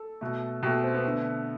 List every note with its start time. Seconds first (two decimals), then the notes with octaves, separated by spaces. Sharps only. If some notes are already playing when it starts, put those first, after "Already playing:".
Already playing: A4
0.21 B2 A3
0.63 B2 G4
0.66 A3
0.83 C4
0.94 B3
1.05 D3 A3